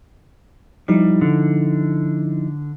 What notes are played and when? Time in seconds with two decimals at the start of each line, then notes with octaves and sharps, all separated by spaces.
0.88 F3 G3 D#4 E4
1.21 D3